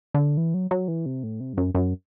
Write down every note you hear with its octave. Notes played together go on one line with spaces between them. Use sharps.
D3
E3
F#3
F#3
E3
C3
A2
C3
G2
F#2
F#2